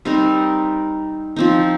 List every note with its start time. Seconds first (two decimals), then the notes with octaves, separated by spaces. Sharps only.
0.05 G3 C4 D#4 A#4
1.36 F3 C4 D#4